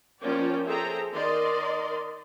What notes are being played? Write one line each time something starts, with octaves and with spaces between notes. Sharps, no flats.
F3 A#3 C#4 D5 G5
G#4 A4 C5 E5 G5 A#5
D#3 A#4 D5 D#5 C6